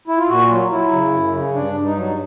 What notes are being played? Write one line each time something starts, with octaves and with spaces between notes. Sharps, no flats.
E4
F4
A#2 F#4
F#3 F4
F#3 E4
C#3
F#2
C#3
G2 D4
G2
D#4
F#3